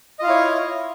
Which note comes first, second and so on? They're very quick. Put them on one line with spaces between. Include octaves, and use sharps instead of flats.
D#5 F4 F5 E4 C#5